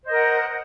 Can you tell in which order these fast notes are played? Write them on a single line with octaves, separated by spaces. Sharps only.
C5 D#5 A#4 F#5